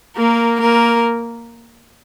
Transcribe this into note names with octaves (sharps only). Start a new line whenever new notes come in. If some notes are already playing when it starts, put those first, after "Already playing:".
A#3 A#4
A#3 A#4